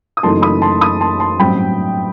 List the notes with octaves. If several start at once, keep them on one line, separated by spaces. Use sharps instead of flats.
D#6
F#1 F#2 E3 A3 D#4 A5 C6
B5 D#6
A5 C6
B5 D#6
A5 C6
A5 C6
A1 G2 F#3 C4 G5 B5